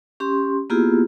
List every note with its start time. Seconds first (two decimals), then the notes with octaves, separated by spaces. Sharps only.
0.20 C#4 G4 C6
0.70 A#3 B3 E4 F4 G4 G#4